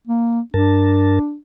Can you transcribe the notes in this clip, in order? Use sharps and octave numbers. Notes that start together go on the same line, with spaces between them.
A#3
G2 D4 A#4 A5